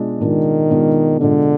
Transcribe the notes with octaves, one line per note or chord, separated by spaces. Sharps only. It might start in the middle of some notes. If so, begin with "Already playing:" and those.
Already playing: B2 G#3 D4 F4
B2 D#3 G#3 D4 F4
B2 G#3 D4 F4
B2 D3 G#3 D4 F4